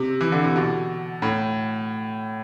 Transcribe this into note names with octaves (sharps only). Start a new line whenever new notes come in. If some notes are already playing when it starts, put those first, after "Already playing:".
Already playing: C3
E3
D3
C3
B2
A2